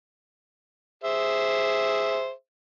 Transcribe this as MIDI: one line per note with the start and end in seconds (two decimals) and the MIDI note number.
1.04 2.31 68
1.04 2.31 72
1.04 2.31 76